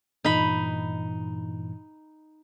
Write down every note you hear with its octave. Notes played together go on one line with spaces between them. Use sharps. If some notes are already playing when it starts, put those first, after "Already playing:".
G2 A#2 E3 D#4 B5